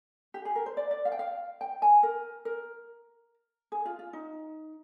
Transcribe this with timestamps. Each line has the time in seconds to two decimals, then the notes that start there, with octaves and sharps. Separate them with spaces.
0.34 G4
0.45 G#4
0.55 A#4
0.66 C5
0.77 D5
0.91 D5
1.05 F5
1.12 G5
1.19 F5
1.61 G5
1.82 G#5
2.03 A#4
2.45 A#4
3.72 G#4
3.86 F4
3.99 F4
4.13 D#4